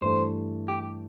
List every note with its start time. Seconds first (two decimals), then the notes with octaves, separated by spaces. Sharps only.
0.01 G2 E3 A3 C5
0.68 G4